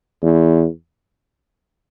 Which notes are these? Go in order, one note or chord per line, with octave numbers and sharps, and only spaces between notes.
E2